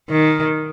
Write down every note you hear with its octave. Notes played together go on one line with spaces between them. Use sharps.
D#3